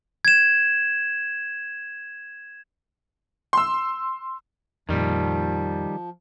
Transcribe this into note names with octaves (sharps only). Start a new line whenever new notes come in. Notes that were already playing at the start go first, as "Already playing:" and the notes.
G#6 E7
C6 E6
F2 A#2 D#3 F3 G3